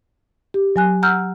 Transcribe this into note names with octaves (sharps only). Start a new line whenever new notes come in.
G4
F#3 G#5 F#6
F#5 A#5 E6 F6 G6